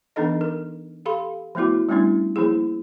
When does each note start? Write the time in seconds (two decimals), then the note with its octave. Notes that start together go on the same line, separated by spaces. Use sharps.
0.16 E3 B3 D4 D#4 A4 D#5
0.41 A#4
1.06 G4 A4 F5 B5 C6
1.55 F3 A3 B3 E4 F#4
1.89 G3 A3 B3 C#4 D4 E4
2.36 F3 A#3 E4 G#4